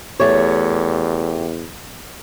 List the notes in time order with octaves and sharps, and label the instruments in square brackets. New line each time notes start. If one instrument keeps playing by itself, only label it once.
[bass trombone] E2 [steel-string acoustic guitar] A3 G4 C#5